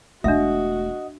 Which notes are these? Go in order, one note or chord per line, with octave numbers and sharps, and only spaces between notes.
E1 A3 D4 F#4 D#5 E5 F#5 D#6